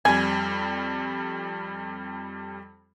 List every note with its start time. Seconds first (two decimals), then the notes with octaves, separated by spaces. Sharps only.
0.05 F2 G3 G#5